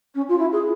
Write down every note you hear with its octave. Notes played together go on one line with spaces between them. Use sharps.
C#4
F4
E4
G#4